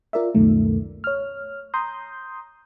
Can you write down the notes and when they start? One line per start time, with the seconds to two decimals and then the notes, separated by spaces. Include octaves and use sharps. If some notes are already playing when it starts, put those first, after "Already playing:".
0.13 F4 A#4 D5 E5
0.35 C#2 F#2 B2 D#3 A3
1.04 C#5 F6
1.74 A#5 C6 D#6 G6